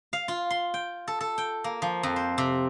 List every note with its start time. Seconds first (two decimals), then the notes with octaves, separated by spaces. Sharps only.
0.13 F5
0.28 F4
0.50 C6
0.74 G5
1.08 A4
1.21 A4
1.38 G5
1.64 A#3
1.82 F3
2.03 F2
2.16 C5
2.38 C3